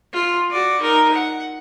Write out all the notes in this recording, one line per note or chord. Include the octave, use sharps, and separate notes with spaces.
F4
F#4 D5
D#4 A#4
F#5